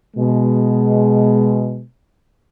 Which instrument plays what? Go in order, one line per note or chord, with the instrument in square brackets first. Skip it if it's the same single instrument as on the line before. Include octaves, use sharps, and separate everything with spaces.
[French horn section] B2 G#3